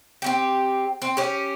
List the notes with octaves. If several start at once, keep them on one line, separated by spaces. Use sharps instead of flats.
C4 C#4 G4
C4
C#4 G4